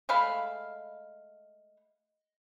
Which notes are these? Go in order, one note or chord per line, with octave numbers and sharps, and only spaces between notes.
G#3 A3 F5 B5